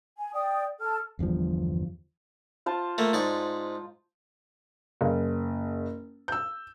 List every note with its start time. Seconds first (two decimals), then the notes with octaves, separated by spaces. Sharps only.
0.17 G#5
0.33 D5 G5 D#6
0.80 A4 A5 F6
1.19 G1 E2 G2 F3
2.66 F4 C5 A5
2.98 A3 A#3
3.13 G#2 D5 C#6
5.01 F#1
6.28 E6 G6